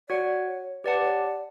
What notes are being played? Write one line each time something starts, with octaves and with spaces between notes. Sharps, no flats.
F#4 C#5 D5 F#5
C#5
G4 B4 D5 F#5 A5
C#5
D5